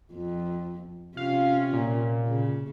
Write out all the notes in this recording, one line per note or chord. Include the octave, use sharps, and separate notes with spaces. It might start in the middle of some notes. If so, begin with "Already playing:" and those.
F2
C3 C#4 F4 F5
A#2
C#3